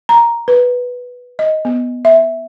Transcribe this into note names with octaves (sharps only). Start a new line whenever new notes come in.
A#5
B4
D#5
B3
E5